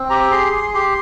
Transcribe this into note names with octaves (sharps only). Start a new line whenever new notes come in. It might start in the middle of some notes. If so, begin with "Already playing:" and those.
Already playing: C4
G4 A#5
G#4 C6
G#4
G4 C6